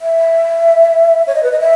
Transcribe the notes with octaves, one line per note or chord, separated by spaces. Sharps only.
E5
C#5
D#5
B4
D#5
E5